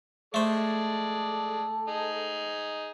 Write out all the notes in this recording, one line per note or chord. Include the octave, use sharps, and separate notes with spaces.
G#3 A3 A4 C5 D5
D#4 G#4